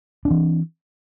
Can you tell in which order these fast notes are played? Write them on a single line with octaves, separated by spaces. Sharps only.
D4 C4 E3